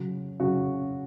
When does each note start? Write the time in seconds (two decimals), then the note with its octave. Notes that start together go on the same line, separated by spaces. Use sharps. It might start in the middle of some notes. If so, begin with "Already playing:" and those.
Already playing: C#3 F#3 C#4
0.40 C#3 F#3 C#4 F#4